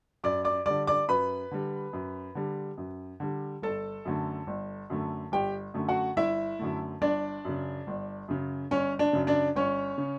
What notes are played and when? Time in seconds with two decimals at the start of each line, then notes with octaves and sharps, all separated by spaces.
0.24 F#2 D5 D6
0.45 D5 D6
0.66 D3 G3 D5 D6
0.87 D5 D6
1.08 F#2 B4 B5
1.51 D3 G3
1.93 F#2
2.35 D3 G3
2.78 F#2
3.20 D3 G3
3.62 G1 A4 A5
4.05 F#2 D3 A3
4.47 G1
4.90 F#2 D3 A3
5.32 G1 G4 G5
5.74 F#2 D3 A3
5.89 F#4 F#5
6.16 G1 E4 E5
6.59 F#2 D3 A3
7.01 G1 D4 D5
7.45 F#2 C#3
7.87 G1
8.28 F#2 C#3
8.71 G1 C#4 C#5
8.99 D4 D5
9.13 F#2 C#3
9.27 D4 D5
9.56 G1 C#4 C#5
9.98 C#3